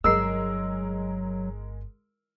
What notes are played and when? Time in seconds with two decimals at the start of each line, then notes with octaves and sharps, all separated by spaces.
0.04 G1 F#3 G#3 D#4 A#4 E6 C7